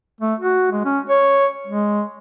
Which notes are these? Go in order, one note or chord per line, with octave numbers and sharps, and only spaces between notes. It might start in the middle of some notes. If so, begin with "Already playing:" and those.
A3
F#4
G#3
C#4
C#5
G#3